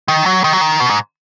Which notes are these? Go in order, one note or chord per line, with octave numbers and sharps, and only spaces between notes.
D#3
F#3
D#3
F#3
D#3
B2
G#2